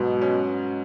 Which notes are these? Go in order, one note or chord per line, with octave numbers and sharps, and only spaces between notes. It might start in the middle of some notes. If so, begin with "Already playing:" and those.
Already playing: G#2 B2 F#3
C#4